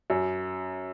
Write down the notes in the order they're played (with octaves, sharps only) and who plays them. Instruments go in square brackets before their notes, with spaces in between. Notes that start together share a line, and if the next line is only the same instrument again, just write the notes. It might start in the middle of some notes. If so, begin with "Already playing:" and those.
[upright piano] F#2